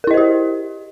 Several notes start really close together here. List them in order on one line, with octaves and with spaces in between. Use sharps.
A#4 E4 D#5 C5 G4